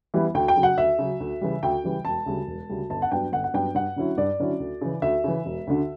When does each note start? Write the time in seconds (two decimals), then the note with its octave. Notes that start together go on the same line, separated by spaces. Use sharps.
0.14 E3 G3 B3 E4
0.34 D2 G5
0.48 G5
0.56 C#3 F#3
0.63 F#5
0.77 D2 E5
0.99 C#3 F#3
1.20 D2
1.41 C#3 E3 G3
1.63 D2 G5
1.84 C#3 E3 G3
2.05 E1 A5
2.26 D2 C#3 G3
2.47 E1
2.69 D2 C#3 G3
2.90 G1 A5
3.02 F#5
3.12 G2 F#3 B3 D4 G5
3.32 G1 F#5
3.44 F#5
3.54 G2 F#3 B3 D4 G5
3.75 G2 F#5
3.96 D3 F#3 C#4 E4
4.18 G2 D5
4.40 D3 F#3 C#4 E4
4.60 D2
4.81 C#3 E3
5.02 D2 E5
5.24 C#3 E3
5.46 E1
5.67 D2 D3